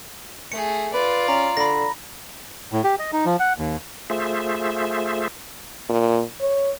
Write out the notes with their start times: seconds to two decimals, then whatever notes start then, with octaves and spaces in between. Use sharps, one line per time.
0.52 A3 G#4 C#7
0.94 F4 B4 D5
1.28 C#4 A#5
1.57 D3 B5 A#6
2.72 A2
2.84 G4
2.99 D#5
3.13 D#4
3.25 F3
3.39 F#5
3.58 D#2
4.10 A3 F4 G#4 C5 E5
5.89 A#2
6.41 C#5